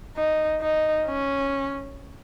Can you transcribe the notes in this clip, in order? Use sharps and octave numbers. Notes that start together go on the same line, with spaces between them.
D#4
D#4
C#4